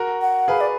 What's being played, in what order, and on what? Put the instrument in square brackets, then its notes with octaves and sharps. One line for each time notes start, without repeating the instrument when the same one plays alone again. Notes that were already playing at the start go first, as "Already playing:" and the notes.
Already playing: [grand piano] F#4 A#4
[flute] F#5
[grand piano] G#4 B4 [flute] F5
[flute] D5